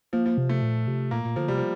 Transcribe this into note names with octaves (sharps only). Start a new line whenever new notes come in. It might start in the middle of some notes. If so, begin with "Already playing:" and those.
F3 A#3
F3
C3
A3
A#2
C3
A#2 A#3
A#2
D3 F3
C3 G3
F3